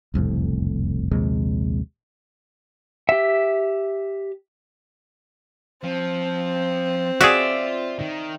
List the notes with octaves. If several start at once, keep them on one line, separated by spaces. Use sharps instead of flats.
E1 C2 F2 A2
A#1 D#2 C3 G#3
G4 E5
F3 C4
F4 F#4 G#4 D5 E5
D#3